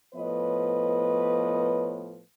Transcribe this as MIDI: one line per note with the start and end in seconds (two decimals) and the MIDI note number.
0.15 2.20 45
0.15 2.20 53
0.15 2.20 59
0.15 2.20 71
0.15 2.20 73
0.15 2.20 75